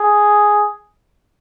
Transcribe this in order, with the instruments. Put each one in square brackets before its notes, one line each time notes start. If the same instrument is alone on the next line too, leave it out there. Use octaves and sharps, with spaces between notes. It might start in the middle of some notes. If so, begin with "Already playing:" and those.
Already playing: [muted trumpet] G#4